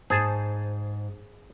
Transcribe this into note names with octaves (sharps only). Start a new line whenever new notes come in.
G#2 G#4 C5 A5